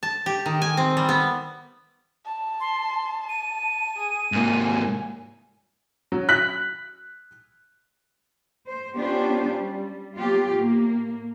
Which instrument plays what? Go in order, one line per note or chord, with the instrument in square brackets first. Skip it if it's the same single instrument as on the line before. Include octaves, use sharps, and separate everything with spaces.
[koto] A5
G4
D#3
G#5
C4
G3
B3
[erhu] A5
[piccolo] C6
D#7
[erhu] G#4
[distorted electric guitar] G#2 A#3 [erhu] G#5
[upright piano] F#3
F#6 B6 F#7
[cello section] C5
B3 C#4 D4 F4 G4 C5
G3
F#3 A#3 B3 F4 G4
A2 A#3